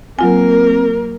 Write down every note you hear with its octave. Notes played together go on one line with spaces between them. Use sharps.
F#3 A#3 C4 F4 A#4 G#5